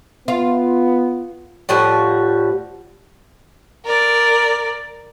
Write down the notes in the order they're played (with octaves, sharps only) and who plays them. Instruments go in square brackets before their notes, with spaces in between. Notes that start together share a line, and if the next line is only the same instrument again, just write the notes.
[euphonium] B3 [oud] F4
[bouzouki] A2 F3 G3 F#4
[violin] A#4 D5